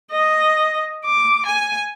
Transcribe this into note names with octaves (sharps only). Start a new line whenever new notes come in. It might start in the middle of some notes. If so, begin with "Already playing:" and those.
D#5
D6
G#5